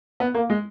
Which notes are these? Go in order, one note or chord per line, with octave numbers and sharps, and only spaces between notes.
B3
A#3
G#3